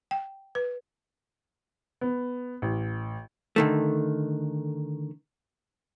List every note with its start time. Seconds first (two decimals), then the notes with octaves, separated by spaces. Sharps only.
0.11 G5
0.55 B4
2.01 B3
2.62 A1
3.56 D3 D#3 A3